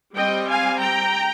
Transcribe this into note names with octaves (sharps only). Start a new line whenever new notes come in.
G3 C4 D#5 G5
F5 G#5
G5 A#5